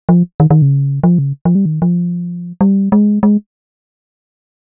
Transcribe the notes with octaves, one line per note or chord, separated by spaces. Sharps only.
F3
D#3
D#3
C#3
F3
C#3
F3
G3
D#3
F3
G3
G#3
G#3